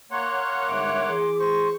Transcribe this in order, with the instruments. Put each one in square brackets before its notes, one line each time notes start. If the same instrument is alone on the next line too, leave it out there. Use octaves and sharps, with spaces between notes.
[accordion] A#3 C#5 F#5 [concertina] C6
[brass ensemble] G1 G#2 E5 [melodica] D6
[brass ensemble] E3 G#4
[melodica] C5 C#6